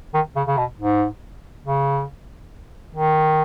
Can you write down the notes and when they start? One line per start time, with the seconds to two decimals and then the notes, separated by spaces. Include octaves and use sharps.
0.14 D#3
0.36 C#3
0.48 C#3
0.58 B2
0.79 G#2
1.65 C#3
2.95 D#3